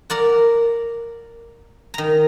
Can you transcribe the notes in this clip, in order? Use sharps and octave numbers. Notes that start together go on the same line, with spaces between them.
A#4 D5 F#5
D#3 A#5